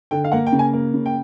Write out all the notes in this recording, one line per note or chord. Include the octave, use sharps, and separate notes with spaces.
D3 G5
F5
A#3 F#5
G5
C#3
G#5
A#3
C#3
G5